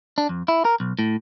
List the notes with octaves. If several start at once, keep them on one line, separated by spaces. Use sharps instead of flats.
D4
F2
E4
A#4
B1
A2